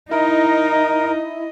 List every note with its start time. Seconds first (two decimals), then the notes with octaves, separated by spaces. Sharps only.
0.11 D#4 E4 A#4 D#5